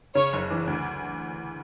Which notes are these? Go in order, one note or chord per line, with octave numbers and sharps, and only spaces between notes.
C#3 C#5
F#1
E3
D2